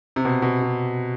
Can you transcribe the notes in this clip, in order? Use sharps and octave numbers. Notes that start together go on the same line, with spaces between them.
C3
B2
B2
C3